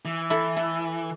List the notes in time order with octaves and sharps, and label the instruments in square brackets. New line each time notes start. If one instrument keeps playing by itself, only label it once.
[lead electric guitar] E3
[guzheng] E4 A4
E4 A4